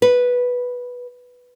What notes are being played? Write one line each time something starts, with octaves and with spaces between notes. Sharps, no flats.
B4